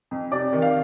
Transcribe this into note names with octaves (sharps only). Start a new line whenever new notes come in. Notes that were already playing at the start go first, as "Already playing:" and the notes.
F2
C3 D5
D#3
F5